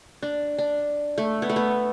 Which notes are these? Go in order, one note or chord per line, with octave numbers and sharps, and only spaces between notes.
D4
D4
A3
B3
A3
B3